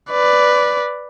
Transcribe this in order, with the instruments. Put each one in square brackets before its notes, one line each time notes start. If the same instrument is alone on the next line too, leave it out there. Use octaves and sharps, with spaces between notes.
[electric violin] B4 D5